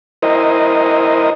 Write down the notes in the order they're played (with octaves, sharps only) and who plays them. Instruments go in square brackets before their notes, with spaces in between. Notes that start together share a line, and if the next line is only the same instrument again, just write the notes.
[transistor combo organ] E4 A#4 C5 D#5